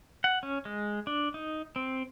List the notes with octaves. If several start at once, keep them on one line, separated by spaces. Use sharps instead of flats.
F#5
C#4
G#3
D4
D#4
C4